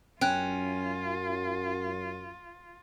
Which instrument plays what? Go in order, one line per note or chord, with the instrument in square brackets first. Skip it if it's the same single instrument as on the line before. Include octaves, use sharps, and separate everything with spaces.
[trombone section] F#2 [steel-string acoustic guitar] C#4 [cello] F4 [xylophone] G5 F#6